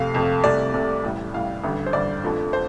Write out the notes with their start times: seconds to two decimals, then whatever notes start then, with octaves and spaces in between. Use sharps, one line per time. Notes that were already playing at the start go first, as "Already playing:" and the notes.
Already playing: F2 C3 A3 F5
0.15 F2 C3 A3
0.44 C2 C3 A3 D5
0.74 C2 C3 A3
1.04 A1 A2 G3
1.33 A1 A2 G3 F5
1.64 A1 G2 D3 G3
1.86 C5
1.93 A1 G2 D3 G3 D5
2.23 G1 F2 D3 F3 A3
2.53 C5